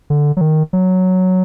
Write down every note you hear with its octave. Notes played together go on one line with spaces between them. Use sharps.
D3
F#3
D#3
F#3